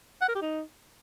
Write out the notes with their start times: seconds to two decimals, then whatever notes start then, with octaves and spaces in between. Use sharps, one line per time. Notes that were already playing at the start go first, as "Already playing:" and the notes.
0.22 F#5
0.28 A#4
0.35 G4
0.42 D#4